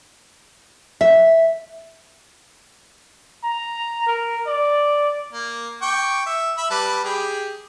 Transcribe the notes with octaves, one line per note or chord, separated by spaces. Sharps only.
E5
A#5
A#4
D5
A#3
G5 C#6 D6
E5
E5 B5
G3 B4 A5
G4 G#4